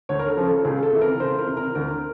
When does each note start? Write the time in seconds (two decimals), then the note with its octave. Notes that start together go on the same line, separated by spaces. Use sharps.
0.09 D2 C#5
0.19 A#4
0.28 A4
0.37 C#3 F3
0.47 A4
0.65 C#2 G#4
0.83 A4
0.93 C3 E3
1.01 A#4
1.20 C#2 C5
1.38 A#4
1.47 C3 E3
1.57 A#4
1.75 D2 A#4